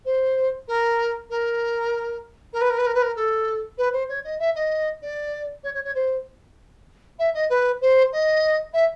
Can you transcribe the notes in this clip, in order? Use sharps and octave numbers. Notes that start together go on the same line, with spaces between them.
C5
A#4
A#4
A#4
B4
A#4
B4
A#4
B4
A#4
A4
B4
C5
C#5
D#5
E5
D#5
D5
C#5
C#5
C#5
C5
E5
D#5
B4
C5
D#5
E5